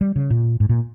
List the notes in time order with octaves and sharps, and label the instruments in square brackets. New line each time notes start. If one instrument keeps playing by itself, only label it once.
[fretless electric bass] G3
C#3
A#2
G#2
A#2